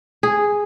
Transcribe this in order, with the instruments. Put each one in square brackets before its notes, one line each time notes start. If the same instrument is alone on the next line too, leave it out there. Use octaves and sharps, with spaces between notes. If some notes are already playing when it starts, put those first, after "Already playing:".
[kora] G#4